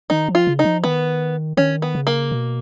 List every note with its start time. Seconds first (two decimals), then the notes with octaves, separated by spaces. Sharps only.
0.10 D#3 D#4
0.28 F3
0.35 F4
0.47 C#3
0.59 D#4
0.65 F3
0.84 D#3 B3
1.57 D#3 C#4
1.82 B3
1.95 C#3
2.07 A#3
2.32 B2